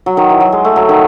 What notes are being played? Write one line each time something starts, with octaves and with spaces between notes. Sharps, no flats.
F#3
D#3
E3
F#3
G#3
A3
F#3
D#3